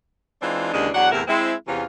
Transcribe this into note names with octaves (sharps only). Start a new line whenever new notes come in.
E3 G#3 C4 D4 D#4 F4
D#2 C#3 E3 G#3 D4
E2 F#3 D4 F#5
E2 A2 C3 E4 A#4
G#3 C4 E4
E2 C3 E3 C#4 F4